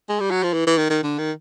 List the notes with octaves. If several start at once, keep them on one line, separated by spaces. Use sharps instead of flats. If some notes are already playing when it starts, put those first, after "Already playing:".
G#3
G3
F#3
F3
E3
E3
D#3
D#3
D3
D#3